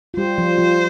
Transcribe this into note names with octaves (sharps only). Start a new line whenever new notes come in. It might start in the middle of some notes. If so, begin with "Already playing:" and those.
F4
G3 G4 C5
F3 F4
F3 F4